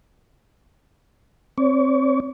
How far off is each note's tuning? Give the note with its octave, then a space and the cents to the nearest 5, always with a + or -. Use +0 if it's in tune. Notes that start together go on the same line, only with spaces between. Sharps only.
C4 +15 C#5 +45